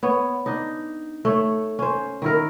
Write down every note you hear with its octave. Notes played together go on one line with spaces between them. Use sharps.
B3 C#5
D4 D#4
A3 C#5
C#4 C5
D#3 E4 A#4